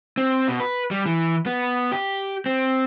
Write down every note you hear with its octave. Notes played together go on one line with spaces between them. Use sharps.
C4
B2
B4
G3
E3
B3
G4
C4